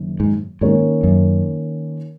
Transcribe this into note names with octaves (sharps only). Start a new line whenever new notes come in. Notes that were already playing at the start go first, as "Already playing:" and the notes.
Already playing: F#1 F#2 D#3
G#2
G#2 D#3 A#3 C#4 A#4 C#5
F#2